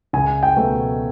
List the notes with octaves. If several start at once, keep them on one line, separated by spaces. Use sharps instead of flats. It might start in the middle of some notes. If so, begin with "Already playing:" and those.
C#2 G#5
G5
B2 F#3 A3